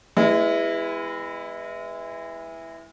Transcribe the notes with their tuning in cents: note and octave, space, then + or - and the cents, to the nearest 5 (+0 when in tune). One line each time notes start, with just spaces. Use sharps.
G#3 -35 B3 +0 E4 +0